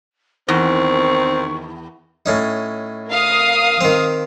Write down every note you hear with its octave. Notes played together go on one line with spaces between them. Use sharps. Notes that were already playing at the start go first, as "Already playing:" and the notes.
E2 D#3 C4 C#6
A2 C#4 D#4
A#4 F5 D#6
D#3 C4